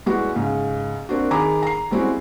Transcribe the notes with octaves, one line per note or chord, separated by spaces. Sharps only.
G3 G#3 B3 E4 F#4 G4
G#2 C#3
A#3 C4 D4 F#4
D#3 G#4 A#5 B5 D6
A#5 C7
G3 G#3 C4 C#4 E4 F#4